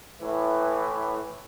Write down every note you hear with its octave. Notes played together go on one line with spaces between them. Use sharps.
A2 E3